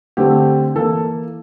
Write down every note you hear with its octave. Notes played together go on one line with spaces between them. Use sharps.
D3 A3 C4 G4
E3 A#3 A4